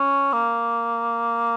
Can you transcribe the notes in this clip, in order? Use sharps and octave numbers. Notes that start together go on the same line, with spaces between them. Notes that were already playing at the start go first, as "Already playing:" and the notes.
Already playing: C#4
A#3